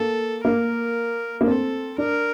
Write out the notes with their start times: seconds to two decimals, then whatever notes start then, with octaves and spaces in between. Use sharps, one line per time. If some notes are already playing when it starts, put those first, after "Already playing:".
Already playing: A#3 A4
0.44 A#3 A#4
1.41 A#3
1.47 C4 A4
1.98 D4 A#4